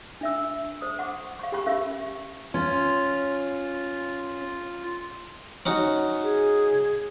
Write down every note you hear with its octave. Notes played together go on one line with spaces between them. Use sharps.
D4 E5 E6
C5 D#6
F#5 C#6 D6
F5 C#6
G4 G5 B5 C#6
C#4 A#4 E5 F5 C#6
C#4 F4
C#4 D#4 F#4
G#4